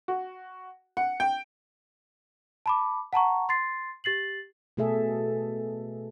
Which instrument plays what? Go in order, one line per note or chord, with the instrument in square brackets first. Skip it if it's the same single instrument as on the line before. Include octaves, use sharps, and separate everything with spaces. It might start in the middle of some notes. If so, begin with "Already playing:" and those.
[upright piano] F#4
F#5
G5
[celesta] A5 B5 D6
F#5 A5 A#5 C#6
C6 A6 C7
G4 A6 C7 F#7
[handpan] B2 A3 G#4 A4 E5